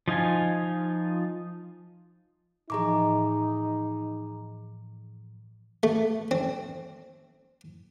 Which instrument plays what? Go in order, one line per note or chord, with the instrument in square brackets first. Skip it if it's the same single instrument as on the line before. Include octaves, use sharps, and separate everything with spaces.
[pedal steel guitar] F3 D#4 F4 G#5
[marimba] A2 E3 F3 [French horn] D#4 [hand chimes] G#4 A#5 D6
[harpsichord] A3
C4